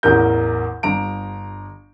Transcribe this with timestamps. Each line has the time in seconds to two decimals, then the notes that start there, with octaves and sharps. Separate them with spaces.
0.03 A1 E2 A#4 G6
0.83 G1 A#5 D7